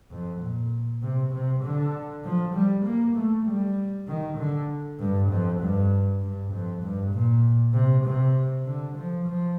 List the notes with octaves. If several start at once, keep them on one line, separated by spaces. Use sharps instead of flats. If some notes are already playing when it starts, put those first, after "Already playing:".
F2
A#2
C3
C3
D3
F3
G3
A#3
A3
G3
D#3
D3
G2
F2
G2
G2
F2
G2
A#2
C3
C3
D3
F3
F3